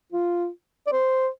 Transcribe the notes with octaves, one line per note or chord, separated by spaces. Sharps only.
F4
D5
C5